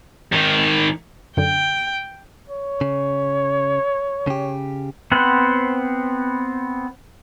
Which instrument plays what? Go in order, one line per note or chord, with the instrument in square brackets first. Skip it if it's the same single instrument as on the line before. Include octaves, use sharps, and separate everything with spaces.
[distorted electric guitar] G#2 D#3
[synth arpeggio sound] F#2 D3 [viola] G5
[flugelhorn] C#5
[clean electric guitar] C#3
C#3 G4
[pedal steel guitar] B3 C4 B4 C5 F#5